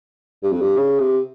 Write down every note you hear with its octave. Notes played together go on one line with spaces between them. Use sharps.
G2
F2
G2
C#3
C3